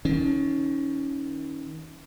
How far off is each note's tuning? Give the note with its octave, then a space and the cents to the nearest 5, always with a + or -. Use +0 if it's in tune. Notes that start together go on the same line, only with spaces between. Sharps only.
D#3 +30 C#4 +0